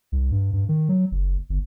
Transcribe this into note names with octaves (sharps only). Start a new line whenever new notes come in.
C2
G2
G2
D#3
F#3
F#1
G1